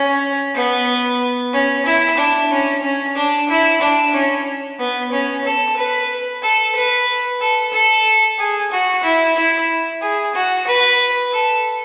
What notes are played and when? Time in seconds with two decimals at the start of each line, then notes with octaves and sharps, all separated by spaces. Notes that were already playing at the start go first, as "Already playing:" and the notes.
Already playing: C#4
0.54 B3
1.53 C#4
1.86 E4
2.18 D4
2.51 C#4
2.83 C#4
3.15 D4
3.49 E4
3.81 D4
4.14 C#4
4.79 B3
5.12 C#4
5.45 A4
5.77 B4
6.42 A4
6.75 B4
7.41 A4
7.73 A4
8.39 G#4
8.72 F#4
9.03 E4
9.37 E4
10.02 G#4
10.35 F#4
10.67 B4
11.33 A4